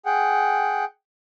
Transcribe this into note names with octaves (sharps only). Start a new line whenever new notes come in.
G#4 F#5 G5